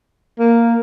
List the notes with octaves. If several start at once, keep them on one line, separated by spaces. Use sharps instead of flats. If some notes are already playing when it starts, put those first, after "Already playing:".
A#3